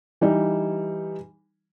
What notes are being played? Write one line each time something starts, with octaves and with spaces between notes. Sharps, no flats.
E3 G3 D#4